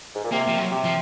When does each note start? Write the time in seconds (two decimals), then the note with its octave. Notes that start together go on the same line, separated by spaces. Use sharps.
0.15 G#2
0.24 A#2
0.32 C3 A#3
0.48 F3
0.58 F#3
0.72 C3
0.85 F3